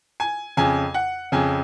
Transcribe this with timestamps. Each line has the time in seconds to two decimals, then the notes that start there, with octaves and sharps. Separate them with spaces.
0.20 G#5
0.57 F2 C#3 G#5
0.94 F#5
1.32 F2 C#3 G#5